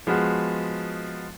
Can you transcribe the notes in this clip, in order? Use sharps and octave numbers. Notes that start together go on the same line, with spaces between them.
F3 G#3 B3 F#4